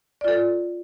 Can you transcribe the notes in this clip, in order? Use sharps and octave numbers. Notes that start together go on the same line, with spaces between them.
F4 A4 D5